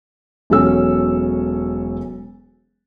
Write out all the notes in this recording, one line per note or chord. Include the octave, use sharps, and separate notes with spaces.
E1 F#3 C#4 A4 E6